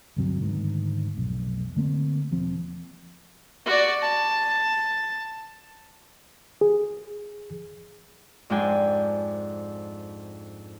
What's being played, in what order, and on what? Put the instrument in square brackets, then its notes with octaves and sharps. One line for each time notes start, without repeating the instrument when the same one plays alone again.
[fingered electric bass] D2 G2 C3 F#3
D2 G#2 D#3
F1 B1
D3 A3 A#3 C4
E1 F3 C4
[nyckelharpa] F#4 D5
A5
[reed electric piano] G#4
[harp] F2 G#2 G#3 D4 G5 G#5